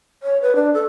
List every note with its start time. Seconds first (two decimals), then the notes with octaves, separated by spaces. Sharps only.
0.23 C#5
0.42 B4
0.55 D4
0.74 A4